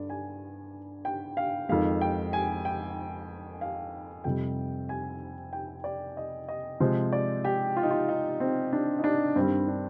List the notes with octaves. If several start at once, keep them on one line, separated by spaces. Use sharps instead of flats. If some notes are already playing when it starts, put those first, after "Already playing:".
Already playing: G2 D3 D5
G#5
G5
F5
F2 D#3 G#3 F5
G5
G#5
G5
F5
F2 C3 G3 G5
G#5
G5
D5
D#5
D#5
C3 F3 G#3 C5
D5
G4
F4
D#4
F4
D#4
C4
D4
D#4
D4
G2 D#3 G3 C4
D4